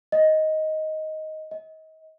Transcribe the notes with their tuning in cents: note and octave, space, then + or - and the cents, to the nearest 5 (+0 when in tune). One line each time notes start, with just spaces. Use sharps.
D#5 +10
D#5 +30